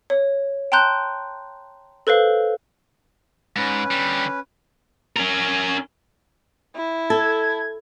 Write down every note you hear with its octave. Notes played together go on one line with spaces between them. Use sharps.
C#5
G5 A5 A#5 C6 F#6 G6
A4 B4 C5 F5
G#2 C#4 B4
D3 G3
C#4 A#4
E4
A4 G#6